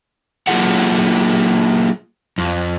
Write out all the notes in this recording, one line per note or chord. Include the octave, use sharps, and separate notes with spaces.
F#3 A#3 F4 G#4 A4 F#5
F2